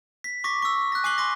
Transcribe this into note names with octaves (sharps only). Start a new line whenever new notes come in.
B6
C#6 D6 A#6 B6
C#6 E6
F#6 A#6
G#5 D6 F#6 C7 F#7 G7
C6 D6 A#6